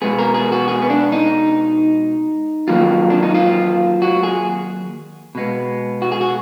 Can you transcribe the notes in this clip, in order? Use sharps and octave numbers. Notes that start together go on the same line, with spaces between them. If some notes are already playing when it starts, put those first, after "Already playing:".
B2 G#3 B3 G#4
A#4
G#4
F#4
G#4
B3
D4
D#4
D#3 F#3 A#3 F4
D4
D#4
F4
F#4
G#4
B2 G#3 B3
F#4
G#4
F#4